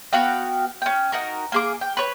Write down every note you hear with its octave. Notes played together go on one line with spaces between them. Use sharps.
B3 F#4 F5 G5
C#4 G5
D#4 F#4 A#4
A#3 G#4 D6
G5
B4 C#5